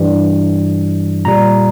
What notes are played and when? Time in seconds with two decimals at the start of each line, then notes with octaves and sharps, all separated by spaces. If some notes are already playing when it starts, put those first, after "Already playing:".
Already playing: G2 E3 G3
1.25 A#2 G3 A#5